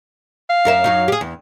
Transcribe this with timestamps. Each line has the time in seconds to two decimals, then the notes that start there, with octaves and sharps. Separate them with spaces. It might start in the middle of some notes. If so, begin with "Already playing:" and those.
0.50 F5
0.65 F#2 A#4 E5
0.84 F#2 F#3 D#4
1.08 G4 G#4
1.21 E2